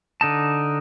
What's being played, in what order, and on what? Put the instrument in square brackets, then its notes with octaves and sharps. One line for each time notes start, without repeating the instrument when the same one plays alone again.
[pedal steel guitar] D3 D#4 A5